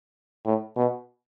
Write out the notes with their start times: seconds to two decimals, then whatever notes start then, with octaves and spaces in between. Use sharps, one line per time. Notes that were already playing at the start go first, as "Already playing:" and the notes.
0.45 A2
0.76 B2